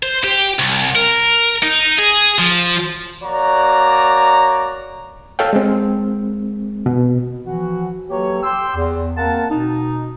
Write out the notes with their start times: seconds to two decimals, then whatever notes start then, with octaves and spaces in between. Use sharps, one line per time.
0.03 C5
0.24 G4
0.59 C2
0.95 A#4
1.63 D#4
1.99 G#4
2.39 F3
3.23 A#3 F#4 C#5 D5 A#5
5.39 A4 C#5 F5 G5
5.53 G#3 C4
6.86 B2
7.45 E3 F3 F#4
8.10 F#3 A#3 G4 A4 B4 C#5
8.43 G5 C6 D6 E6
8.75 E2
9.17 A#3 C4 A#4 F5 F#5 A5
9.51 B2 D#4